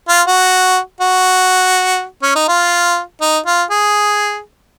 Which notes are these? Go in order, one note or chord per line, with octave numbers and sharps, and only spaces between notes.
F4
F#4
F#4
C#4
D#4
F4
D#4
F4
G#4